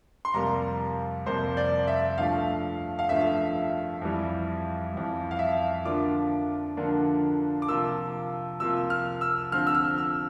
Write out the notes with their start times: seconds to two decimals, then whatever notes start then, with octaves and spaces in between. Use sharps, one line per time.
0.25 C6
0.34 F2 C3 G3 A#3 A#5
1.26 F2 C3 G3 A#3 C5
1.57 D5
1.88 E5
2.18 G2 F3 A3 F5
2.99 F5
3.09 G2 F3 A3 E5
4.02 F2 E3 G3
4.93 F2 E3 G3
5.31 F5
5.39 E5
5.85 D3 F3 A#3 D4 F4 D6
6.77 D3 F3 A#3 D4 F4
7.62 D6
7.68 C3 F3 A#3 F4 E6
8.60 C3 F3 A#3 F4 E6
8.90 F6
9.21 E6
9.52 D3 F3 C4 F4 F6
9.67 E6
9.75 F6
9.98 E6